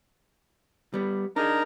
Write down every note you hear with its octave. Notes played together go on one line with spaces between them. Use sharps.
G3 B3
D4 D#4 G#4 A#4 A#5